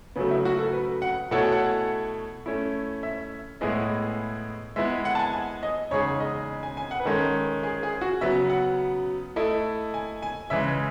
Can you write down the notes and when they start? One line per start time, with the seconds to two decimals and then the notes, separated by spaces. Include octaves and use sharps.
0.16 C#3 F#3 A3 B3
0.31 E4
0.45 F#4
0.59 A4
0.73 B4
1.02 F#5
1.31 B2 A3 E4 A4 C#5 F#5
1.42 G#5
1.52 F#5
2.46 A3 C#4 E4
3.03 E5
3.61 A2 G#3 B3 E4 G#4 D#5
4.76 G#3 B3 E4 E5
5.05 F#5
5.15 A5
5.19 G#5
5.33 G#5
5.63 D#5
5.91 E2 C#3 G#3 D#4 G#4 C#5
6.20 D#5
6.63 G#5
6.77 G#5
6.91 F#5
7.00 B4
7.05 D#3 G#3 C#4 A4
7.63 G#4
7.83 G#4
8.01 F#4
8.21 C#3 F#3 B3 E5
8.50 F#5
9.36 A3 E4 A4 D#5
9.94 G#5
10.22 G#5
10.50 C#3 E3 G#3 E5